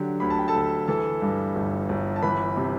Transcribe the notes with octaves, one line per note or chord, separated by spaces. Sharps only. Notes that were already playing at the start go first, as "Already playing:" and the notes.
Already playing: D3 F#3 G4
D2 B5
A5
G5
A4 A5
D2
E3 A4 A5
G2
G1
G1
A5
E3 B4 B5
C3